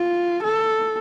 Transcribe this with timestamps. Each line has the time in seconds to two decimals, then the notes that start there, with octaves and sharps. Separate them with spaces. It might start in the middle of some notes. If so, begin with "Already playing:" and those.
Already playing: F4
0.44 A4